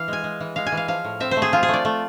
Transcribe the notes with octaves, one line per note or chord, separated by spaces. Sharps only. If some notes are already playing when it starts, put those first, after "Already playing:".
Already playing: E3 F5
G#3 G#5
G#3
E3
G#3 F5
G#5
E3
F5
F3 F5
A2
C4 E5
C5
A3
G#4
F3 F4
G#4
A3
D5
A3